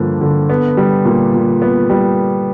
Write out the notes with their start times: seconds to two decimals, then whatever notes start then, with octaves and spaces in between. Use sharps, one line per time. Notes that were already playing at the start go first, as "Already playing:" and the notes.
Already playing: G2 D3 F3 A#3
0.21 D3
0.50 B3
0.77 G3
1.05 A#2
1.34 A#2
1.62 B3
1.90 G3